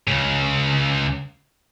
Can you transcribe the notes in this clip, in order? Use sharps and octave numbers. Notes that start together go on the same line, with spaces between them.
C#2 C#3